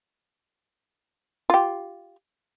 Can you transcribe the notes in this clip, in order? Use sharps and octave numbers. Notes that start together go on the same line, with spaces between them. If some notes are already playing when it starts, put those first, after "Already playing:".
F4 G4